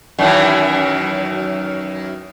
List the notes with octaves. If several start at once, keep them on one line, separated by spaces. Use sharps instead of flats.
F#2 D#3 E3